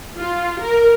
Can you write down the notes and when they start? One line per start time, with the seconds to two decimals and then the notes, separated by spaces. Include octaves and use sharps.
0.17 F4
0.60 A#4